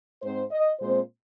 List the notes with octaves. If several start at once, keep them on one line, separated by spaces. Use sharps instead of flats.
G#2 G#3 C4 C5
D#5
A#2 G#3 C4 C5